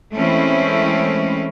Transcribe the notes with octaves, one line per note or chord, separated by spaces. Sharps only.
E3 G#3 A3 C4 C#4 E4